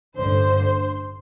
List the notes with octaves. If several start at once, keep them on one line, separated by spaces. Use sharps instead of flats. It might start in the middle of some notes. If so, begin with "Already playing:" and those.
A1 G2 D3 C5 C6